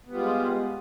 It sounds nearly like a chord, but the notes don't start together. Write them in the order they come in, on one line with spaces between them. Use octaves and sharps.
B3 G3 F4 G#3